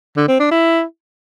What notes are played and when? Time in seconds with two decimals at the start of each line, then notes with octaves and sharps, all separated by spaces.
0.17 D3
0.28 C4
0.40 D4
0.52 E4